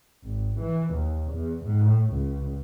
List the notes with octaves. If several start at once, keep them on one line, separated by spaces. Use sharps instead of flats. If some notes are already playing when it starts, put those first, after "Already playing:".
G#1
E3
D#2
E2
A2
C#2